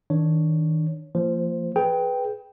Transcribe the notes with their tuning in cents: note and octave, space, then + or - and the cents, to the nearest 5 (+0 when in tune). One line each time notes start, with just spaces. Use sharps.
D#3 +30 D4 +0 C#5 +0
F3 -30 A#3 -35 C5 +0
G#4 +25 B4 +0 G5 +0